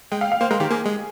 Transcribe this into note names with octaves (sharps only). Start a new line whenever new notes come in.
G#3 G5
F5
F5
A#3 C5
G#3 A#4
D#3 G4
A#3 G#4
G#3